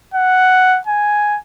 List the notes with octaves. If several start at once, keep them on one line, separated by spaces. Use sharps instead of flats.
F#5
G#5